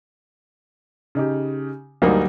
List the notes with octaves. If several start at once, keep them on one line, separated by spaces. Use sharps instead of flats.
C#3 D#4 G4
D2 F#3 G3 A#3 D#4